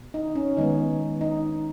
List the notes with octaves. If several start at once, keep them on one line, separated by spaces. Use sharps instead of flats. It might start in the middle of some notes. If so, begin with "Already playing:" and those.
Already playing: B2
D#4
C#4
D#3 G#3 B3 D#4
D#4